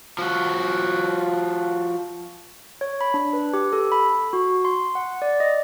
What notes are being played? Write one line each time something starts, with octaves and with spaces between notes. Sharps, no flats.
F3 F#4
C#5
B5
D4
B4
G4
A4
B5
F#4
C6
F#5
D5
D#5